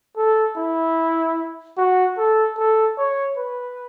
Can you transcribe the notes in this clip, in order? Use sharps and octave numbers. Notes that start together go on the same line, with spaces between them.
A4
E4
F#4
A4
A4
C#5
B4